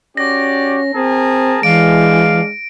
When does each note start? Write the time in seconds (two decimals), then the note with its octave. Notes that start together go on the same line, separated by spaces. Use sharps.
0.17 C#4 F#4 G4 D5 A#6
0.95 C4 G#4 A#4 A5
1.63 E3 G#3 D4 F5 D7